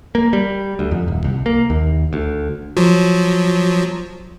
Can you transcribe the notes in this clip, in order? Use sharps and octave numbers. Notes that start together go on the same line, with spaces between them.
A#3
G3
D2
F2
D#1
C2
A#3
D#2
D2
F3 F#3